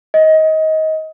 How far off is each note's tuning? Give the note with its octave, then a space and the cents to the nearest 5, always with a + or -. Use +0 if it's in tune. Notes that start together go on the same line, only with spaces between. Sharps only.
D#5 +20